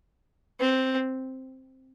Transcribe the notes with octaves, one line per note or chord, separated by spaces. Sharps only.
C4